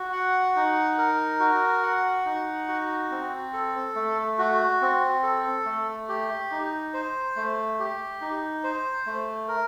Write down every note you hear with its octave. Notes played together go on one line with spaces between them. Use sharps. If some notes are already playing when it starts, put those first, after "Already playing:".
Already playing: F#4
F#5
D#4
A#4
F#4
F#5
D#4
F#4
C4
A4
A3
F#4
C4
A4
A3
G4
D#4
C5
A3
G4
D#4
C5
A3
A#4